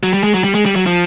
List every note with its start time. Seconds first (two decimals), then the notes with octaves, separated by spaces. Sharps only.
0.03 F#3
0.14 G3
0.24 G#3
0.34 F#3
0.44 G3
0.55 G#3
0.65 G3
0.76 F#3
0.86 F3